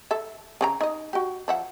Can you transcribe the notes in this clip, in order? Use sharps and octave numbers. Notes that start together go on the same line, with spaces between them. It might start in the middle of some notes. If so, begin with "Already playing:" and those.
A4 E5
C#3 C#4 A#5
D#4 D#5
F#4 G4
F3 E5 F#5